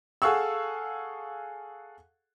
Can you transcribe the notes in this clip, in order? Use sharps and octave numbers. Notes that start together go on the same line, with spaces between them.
G#4 A4 F5 F#5 C#6 E6